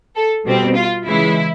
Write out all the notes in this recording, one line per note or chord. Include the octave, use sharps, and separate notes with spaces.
A4
B2 G3 C4
F4
C#3 E3 G#3 E4